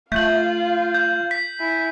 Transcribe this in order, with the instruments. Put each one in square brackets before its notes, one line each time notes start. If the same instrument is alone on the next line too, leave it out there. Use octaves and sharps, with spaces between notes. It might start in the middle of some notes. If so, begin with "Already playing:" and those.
[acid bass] A3 [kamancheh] F4 F5 [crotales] G6 F#7
[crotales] G6
B6
[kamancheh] E4 G#5